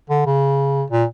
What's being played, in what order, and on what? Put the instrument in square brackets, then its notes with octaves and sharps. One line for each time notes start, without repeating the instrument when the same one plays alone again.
[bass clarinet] D3
C#3
A#2